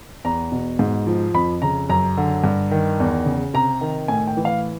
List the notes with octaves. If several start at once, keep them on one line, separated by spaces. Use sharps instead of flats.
E2 A#5
B2
G#2
F3
F2 B5
C#3 A#5
F#2 A#5
D3
G2
D#3
E2
C#3
C3 A#5
D#3
A2 G#5
G5
E3
F5